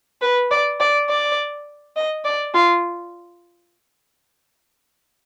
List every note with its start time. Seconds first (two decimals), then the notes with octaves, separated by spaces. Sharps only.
0.21 B4
0.51 D5
0.80 D5
1.09 D5
1.96 D#5
2.25 D5
2.54 F4